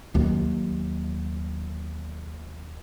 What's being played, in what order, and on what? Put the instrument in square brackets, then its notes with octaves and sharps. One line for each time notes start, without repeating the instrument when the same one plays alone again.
[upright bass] D#2 F#3